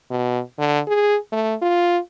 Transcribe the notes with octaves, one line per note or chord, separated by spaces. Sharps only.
B2
D3
G#4
A3
F4